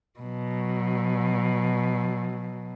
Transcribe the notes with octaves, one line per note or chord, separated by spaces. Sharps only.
B2 F#3